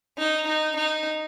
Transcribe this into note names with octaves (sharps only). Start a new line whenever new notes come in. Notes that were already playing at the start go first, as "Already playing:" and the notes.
D#4
D#4
D#4